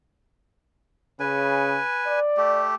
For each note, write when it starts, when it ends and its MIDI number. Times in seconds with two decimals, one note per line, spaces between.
1.20 1.77 49
1.20 2.20 71
1.20 2.20 80
2.06 2.65 74
2.37 2.75 57
2.37 2.75 67